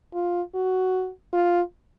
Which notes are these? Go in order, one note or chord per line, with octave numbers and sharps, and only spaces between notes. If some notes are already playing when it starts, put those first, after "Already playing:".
F4
F#4
F4